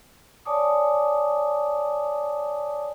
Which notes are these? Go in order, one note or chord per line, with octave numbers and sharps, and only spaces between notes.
C#5 D5 G#5 A5 D6 D#6